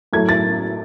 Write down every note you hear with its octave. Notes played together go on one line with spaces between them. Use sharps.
A2 F#3 A3 G#6
A6